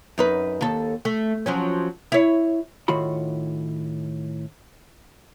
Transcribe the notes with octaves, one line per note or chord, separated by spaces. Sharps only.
F#2 D#4 B4
D#2 A4
A3
F3 F#3 C#4
E4 C#5
A2 D#3 F4 F#4 B5